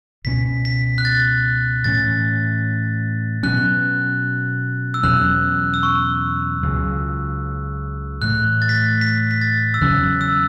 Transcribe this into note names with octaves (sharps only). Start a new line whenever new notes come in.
C#2 B2 A3 C#4 B6
B6
F#6
A6
A2 E3 C#4 A6
B2 F#3 C#4 F#6
E6
E2 B2 F#3 C#4 F#6
E6
C#6
C#2 C#3 F#3
A2 E3 A3 F#6
A6
B6
A6
B6
B6
A6
E6
E2 C#3 F#3 C#4 F#6
E6